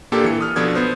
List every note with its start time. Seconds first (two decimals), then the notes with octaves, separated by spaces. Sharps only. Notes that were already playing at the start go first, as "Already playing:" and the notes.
0.12 A#2 A#3 D4 G4 A4
0.24 E3 C#7
0.41 D#6 F6
0.56 B2 F3 B3 D4 A4 G#6
0.75 B3 C5